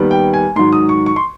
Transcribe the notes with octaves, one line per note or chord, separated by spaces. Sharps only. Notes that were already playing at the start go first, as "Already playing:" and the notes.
Already playing: D#2 D#3 G3 B3
G5
G#5
G#2 D#3 F#3 C6
D#6
C#6
C#6
C6